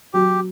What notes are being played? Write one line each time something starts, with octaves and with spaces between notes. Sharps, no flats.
F#3 G4